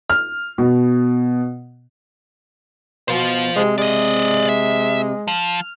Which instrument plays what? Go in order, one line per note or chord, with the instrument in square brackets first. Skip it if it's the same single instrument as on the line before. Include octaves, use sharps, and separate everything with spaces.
[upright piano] F6
B2
[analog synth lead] B2 [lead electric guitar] F4 C5
[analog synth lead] C3 [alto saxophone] G#3
[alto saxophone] G#3 [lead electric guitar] D5 D#5
[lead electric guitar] E5
[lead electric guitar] F3 [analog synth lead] F6